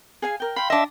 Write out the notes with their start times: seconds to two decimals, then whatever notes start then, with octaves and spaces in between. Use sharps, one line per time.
0.22 G#4 F5 G#5
0.40 A#4 G5
0.56 F5 G5 B5 C6
0.70 D4 D#5 E5